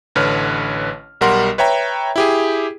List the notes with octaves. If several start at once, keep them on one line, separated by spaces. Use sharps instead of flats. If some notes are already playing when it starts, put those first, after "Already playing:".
A1 D3 B4 C#5 F6
B1 G3 A#4 F#5 C6
B4 C#5 E5 G5 A#5
E4 G4 G#4